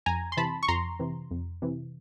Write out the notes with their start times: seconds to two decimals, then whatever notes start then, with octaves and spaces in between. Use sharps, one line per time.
0.06 F2 G#5 A#5
0.32 C6
0.37 C3 E3 A5 B5
0.63 C#6
0.68 F2 A#5 C6
0.99 C3 E3
1.31 F2
1.62 C3 E3